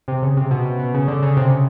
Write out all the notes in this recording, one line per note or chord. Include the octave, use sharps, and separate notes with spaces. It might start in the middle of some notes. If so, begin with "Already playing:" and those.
C3
C#3
C3
B2
B2
B2
C#3
D3
C#3
C3
C#3